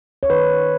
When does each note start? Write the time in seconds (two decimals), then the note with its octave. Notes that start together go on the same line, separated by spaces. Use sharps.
0.23 C#5
0.29 D#3 B4